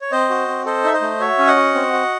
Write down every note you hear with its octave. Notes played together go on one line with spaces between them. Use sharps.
C#5
C4 C5 D#5
F#4
C4
A4 C5 D#5
D#4 E5
C5 D#5
A3
F#4 C#5 E5
C#4
D#5 F#5
F#4
C4
F#4